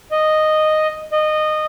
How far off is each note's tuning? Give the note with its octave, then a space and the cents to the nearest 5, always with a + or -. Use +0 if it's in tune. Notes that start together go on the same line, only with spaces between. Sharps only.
D#5 -5
D#5 -20